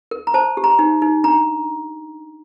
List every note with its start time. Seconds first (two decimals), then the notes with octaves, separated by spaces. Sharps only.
0.11 A#4
0.27 A#5
0.34 C5 A5
0.57 G4
0.64 A#5
0.79 D#4
1.02 D#4
1.24 D4 A#5